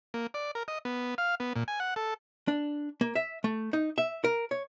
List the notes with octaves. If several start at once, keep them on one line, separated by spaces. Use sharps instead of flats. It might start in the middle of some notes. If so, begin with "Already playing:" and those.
A#3
D5
A#4
D#5
B3
F5
B3
A#2
G#5
F#5
A4
D4
A#3
E5
A3
D#4
E5
A#4
C#5